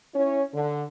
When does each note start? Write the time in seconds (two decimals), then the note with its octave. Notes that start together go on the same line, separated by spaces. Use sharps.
0.14 C#4 E4 C#5
0.54 D3